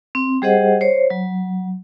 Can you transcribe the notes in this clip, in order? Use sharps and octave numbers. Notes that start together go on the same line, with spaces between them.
C4
G3 G4 G#4 C5 D#5 F#5
C5 C#5
F#3